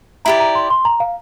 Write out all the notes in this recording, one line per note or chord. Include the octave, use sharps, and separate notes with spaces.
E4 G4 D5 A#5
A#5
C6
C6
A#5
F5